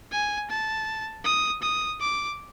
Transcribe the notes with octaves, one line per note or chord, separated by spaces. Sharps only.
G#5
A5
D#6
D#6
D6